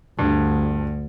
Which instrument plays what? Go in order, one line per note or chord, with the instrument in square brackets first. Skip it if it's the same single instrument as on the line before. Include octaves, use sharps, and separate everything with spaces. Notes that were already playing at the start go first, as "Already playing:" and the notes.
[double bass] D2 [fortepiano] G2